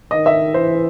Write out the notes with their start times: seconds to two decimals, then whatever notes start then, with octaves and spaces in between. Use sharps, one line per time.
0.11 D#3 D#5
0.26 E5
0.54 E3 C5